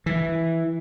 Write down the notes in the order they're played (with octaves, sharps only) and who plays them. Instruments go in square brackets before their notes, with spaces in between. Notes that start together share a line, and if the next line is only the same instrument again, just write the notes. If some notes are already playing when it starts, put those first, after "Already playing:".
[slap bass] E3